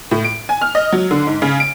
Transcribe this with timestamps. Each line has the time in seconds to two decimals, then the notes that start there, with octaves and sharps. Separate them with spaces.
0.11 A2
0.25 D7
0.49 G#5
0.61 F6
0.75 D#5
0.92 F#3
1.11 D3
1.27 G#2
1.42 C#3
1.60 D7